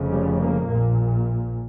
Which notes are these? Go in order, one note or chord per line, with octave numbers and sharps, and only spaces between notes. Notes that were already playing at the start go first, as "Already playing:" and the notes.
Already playing: F1 F2 C#3
G3
A#3
A#1 A#2